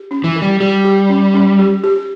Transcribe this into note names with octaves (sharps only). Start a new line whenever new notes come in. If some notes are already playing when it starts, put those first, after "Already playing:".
Already playing: G4
C#4
E3
A#4
G3
G3 G4
G4
C#4
C#4
G4
G4